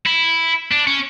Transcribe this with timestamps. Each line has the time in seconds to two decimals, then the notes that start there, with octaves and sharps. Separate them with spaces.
0.06 E4
0.71 D4
0.87 C#4